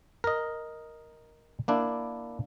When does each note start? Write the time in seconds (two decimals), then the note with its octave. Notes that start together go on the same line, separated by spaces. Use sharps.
0.24 A#4 D#5
1.68 A#3 D4 E4